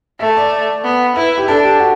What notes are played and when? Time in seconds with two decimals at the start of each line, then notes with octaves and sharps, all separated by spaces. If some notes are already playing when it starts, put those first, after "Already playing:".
0.20 A3 E5
0.37 D5
0.84 B3
1.16 E4 B4
1.38 G4
1.48 D4 A4
1.64 G4
1.80 F#4